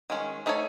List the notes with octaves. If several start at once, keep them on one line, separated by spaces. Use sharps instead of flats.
D#3 G#3 C#4
A3 D#4 A4 C#5